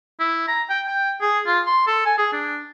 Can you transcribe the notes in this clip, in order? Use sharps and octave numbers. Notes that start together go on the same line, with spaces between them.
E4
A#5
G5
G5
G#4
F4
C6
A4
G#5
G#4
D4